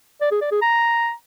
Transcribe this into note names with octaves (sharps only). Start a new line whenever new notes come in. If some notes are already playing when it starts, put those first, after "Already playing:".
D5
G#4
D5
G#4
A#5